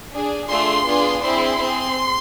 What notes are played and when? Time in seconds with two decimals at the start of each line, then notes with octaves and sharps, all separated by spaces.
0.11 D4 G#4
0.49 A3 D4 F4 G#4 C6
0.86 B3 D4 F4 G#4
1.23 C4 E4 G#4 C6
1.60 C4 G#4